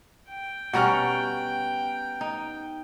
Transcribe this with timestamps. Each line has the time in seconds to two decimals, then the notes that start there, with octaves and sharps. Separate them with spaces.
0.29 G5
0.73 B2 G3 C#4 F#5 A#5 F6
2.21 D#4